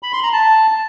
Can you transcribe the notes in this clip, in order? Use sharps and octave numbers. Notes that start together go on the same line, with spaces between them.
B5
C6
A#5
A5